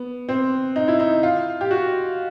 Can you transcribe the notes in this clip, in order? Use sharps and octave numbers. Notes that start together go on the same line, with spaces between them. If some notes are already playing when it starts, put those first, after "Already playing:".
Already playing: B3
C4
D#4
E4
D#4
F4
G4
F#4